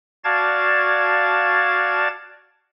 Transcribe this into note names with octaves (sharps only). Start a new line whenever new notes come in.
F#4 D5 F5 A5 G#6 A6